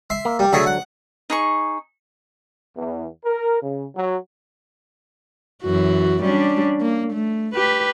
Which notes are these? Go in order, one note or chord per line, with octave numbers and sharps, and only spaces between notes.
E5 C6
A#3
G3
D3 F#3 A3 G#4 E5
F#5
D#4 G#4 C#6
E2
A#4
C#3
F#3
F#2 E3 F#4
G3 C#4 D4
A#3
A3
G4 B4